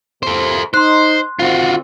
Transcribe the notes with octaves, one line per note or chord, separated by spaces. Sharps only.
C3 A#3 E4 A4 C5
D#4 C5 C6 F#6
D3 D#3 C4 F4 F#4